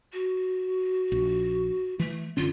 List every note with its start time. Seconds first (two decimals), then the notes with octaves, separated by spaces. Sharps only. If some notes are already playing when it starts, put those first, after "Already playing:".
0.13 F#4
1.12 A#1
1.99 E3 A3
2.37 F#1 D3 C#4 F4